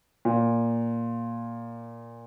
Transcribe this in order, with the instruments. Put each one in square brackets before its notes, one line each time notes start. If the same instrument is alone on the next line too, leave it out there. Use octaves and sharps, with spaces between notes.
[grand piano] A#2